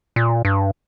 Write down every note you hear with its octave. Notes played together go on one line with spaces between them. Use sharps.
A#2
G2